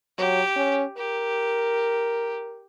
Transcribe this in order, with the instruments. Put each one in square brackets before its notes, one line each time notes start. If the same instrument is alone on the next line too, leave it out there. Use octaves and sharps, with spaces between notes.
[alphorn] F#3 [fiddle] G4
[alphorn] C#4
[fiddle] G4 [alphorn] A#4